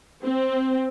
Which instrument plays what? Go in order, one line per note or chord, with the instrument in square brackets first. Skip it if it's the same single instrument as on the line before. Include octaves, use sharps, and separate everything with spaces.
[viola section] C4